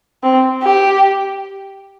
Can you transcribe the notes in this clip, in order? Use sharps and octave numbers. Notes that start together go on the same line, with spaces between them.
C4
G4